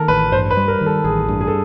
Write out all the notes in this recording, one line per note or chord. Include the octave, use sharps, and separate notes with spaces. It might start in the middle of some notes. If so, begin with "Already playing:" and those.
Already playing: D#3 A4 A#4
A1 B4
G2 C5
B4
G3
A#4
D#3
A4
A1 G#4
G2
G#4
A4